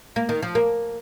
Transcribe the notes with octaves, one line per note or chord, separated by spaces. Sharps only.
A#3
D#3
F3
A#3